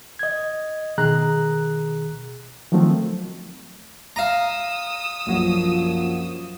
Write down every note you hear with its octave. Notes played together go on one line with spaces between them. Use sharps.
D#5 G#6
B2 D#3 G#4 A#5 F#6
D#3 F3 F#3 A3 C4
F5 A#5 D#6 E6
A#1 F#2 F3 F#3